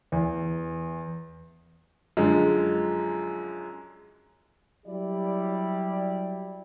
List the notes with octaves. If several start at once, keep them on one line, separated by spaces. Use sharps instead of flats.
E2
F#2 D3 F3 G#3
F#3 G3 E4 G4 D5